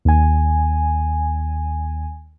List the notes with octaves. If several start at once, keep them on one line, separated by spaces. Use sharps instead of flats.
D#2 G#5